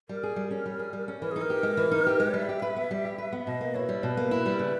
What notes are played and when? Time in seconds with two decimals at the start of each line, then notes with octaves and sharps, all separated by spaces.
0.09 G3 A#4
0.23 G#4
0.36 G3
0.51 C#4
0.66 G3
0.79 G#4
0.93 G3
1.08 C#4
1.22 E3 A#4
1.31 D#4 G#4
1.41 A#4
1.50 G4
1.63 G#3
1.77 E3
1.91 D#4
2.07 G4
2.20 G#3
2.34 G3 E5
2.49 G4
2.62 B4
2.76 B3
2.91 G3
3.05 G4
3.18 B4
3.33 B3
3.46 B2 D#5
3.61 A#3
3.75 E4 C#5
3.89 G3
4.03 B2 B4
4.17 A#3
4.31 E4
4.46 G3
4.54 A#4
4.59 C#3 B4